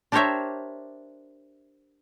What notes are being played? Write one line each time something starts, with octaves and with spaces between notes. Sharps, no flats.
D4 G4 A#4 C5 C#5 E5